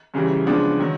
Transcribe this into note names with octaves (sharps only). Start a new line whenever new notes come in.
F#2 C#3 E3 G3
C#3 F3 G#3 B3 D4
D#3 F#3